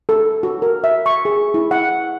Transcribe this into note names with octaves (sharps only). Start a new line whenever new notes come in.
A4
F#4
A#4
E5
C#6
G#4
E4
F#5